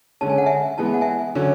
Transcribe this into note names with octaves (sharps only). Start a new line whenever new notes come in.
D3 G#3 C#4 A5
G#5
F#5
E5 G#5
E3 G#3 B3 A5
G#5
F#5
E5 G#5
D3 F#3 C#4